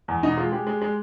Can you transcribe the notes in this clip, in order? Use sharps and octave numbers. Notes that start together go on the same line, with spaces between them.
E2
B2 D#4
G#3 F4
G#3 G4
G#3
G#3